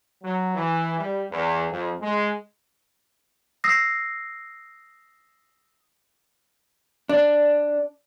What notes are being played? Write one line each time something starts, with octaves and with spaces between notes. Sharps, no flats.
F#3
E3
G3
E2
F2
G#3
D#6 E6 A#6 C7
D4